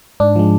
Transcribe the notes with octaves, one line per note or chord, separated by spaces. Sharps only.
G#2 D4
F3 G#3